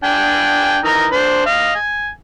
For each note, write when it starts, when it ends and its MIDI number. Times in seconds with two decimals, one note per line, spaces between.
0.04 0.77 62
0.04 0.77 79
0.04 0.77 80
0.85 1.06 52
0.85 1.06 63
0.85 1.06 70
1.12 1.43 62
1.12 1.43 72
1.46 1.73 75
1.46 1.73 77
1.75 2.09 80